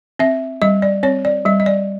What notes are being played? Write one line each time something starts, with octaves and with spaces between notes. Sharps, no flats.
C4 E5
G3 D#5
D5
C4 C#5
D5
G3 D#5
D#5
D5